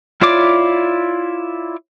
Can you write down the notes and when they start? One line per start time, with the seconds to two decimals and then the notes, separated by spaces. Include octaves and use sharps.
0.21 E4 F4 C#5 D5 D6